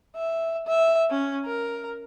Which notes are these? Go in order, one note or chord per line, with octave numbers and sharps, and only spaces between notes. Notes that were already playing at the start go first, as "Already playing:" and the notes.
E5
E5
C#4
A#4